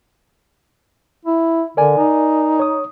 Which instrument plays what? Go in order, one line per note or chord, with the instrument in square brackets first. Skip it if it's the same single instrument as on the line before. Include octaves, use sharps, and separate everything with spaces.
[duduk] E4
[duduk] D3 [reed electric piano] A#4 D5 G#5
[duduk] D#4
[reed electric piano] C#5 D#6